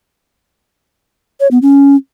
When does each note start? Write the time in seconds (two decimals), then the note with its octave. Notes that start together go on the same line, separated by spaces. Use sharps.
1.40 C#5
1.51 B3
1.62 C#4